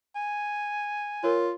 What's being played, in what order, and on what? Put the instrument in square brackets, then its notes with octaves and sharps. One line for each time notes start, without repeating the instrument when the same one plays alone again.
[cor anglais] G#5
[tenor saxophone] F4 [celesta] A#4 C#5